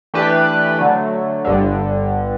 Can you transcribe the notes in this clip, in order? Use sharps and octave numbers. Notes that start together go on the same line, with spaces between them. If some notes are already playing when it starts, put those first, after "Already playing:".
E3 A3 D4 G4 B4
D3 F#3 A3
G1 G2 D3